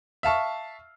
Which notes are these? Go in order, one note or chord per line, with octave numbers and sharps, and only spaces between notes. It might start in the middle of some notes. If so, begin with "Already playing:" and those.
E5 F5 A5 C#6